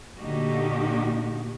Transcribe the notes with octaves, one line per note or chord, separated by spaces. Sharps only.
A#2 D3 A#3 D#4 F#4 G4